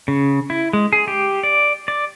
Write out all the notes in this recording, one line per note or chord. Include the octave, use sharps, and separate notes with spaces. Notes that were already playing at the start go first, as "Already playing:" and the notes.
C#3
E4
G#3
G#4
G4
D5
D5